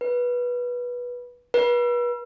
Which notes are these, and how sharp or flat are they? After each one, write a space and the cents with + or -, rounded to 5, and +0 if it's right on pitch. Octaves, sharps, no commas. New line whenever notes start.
B4 -15
B4 -35